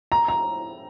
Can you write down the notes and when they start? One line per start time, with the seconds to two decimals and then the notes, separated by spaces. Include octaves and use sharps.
0.12 A#5
0.28 A#5